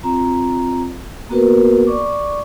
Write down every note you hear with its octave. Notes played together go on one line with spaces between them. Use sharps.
C4 F4 A#5
A#3 B3 F#4 A#4 B4
D5 C#6 D6